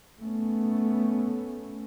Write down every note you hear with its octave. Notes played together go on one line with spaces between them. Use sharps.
A3 B3 C#4